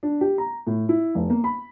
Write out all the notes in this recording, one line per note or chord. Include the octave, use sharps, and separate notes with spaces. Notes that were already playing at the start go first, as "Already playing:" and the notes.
D4
G4
A#5
A2
E4
F1
A#3
B5